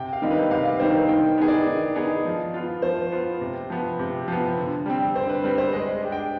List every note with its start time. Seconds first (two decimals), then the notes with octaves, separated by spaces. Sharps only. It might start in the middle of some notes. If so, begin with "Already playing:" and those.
Already playing: C3 G5
0.13 F5
0.22 D#3 G3 C4 D#4
0.31 B4
0.51 C3 F5
0.65 F5
0.80 D#3 G3 C4 D#4 C5
0.94 C5
1.09 D#3 G5
1.38 B3 D#4 G#4
1.48 D5
1.67 D#3
1.95 B3 D#4 G#4
2.25 F3
2.54 B3 F4
2.82 F3 C5
3.12 B3 F4
3.41 C3
3.70 F3 B3
3.99 C3
4.28 F3 B3
4.57 D3
4.86 G3 C4
5.15 D3 C5
5.29 B4
5.43 G3 C4 B4
5.58 C5
5.72 G#3 D#5
6.02 D4 G4
6.12 G5